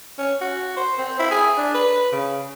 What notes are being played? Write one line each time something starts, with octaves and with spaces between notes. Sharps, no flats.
C#4
F#4
C5
C4
E4
G#4
D4
B4
C#3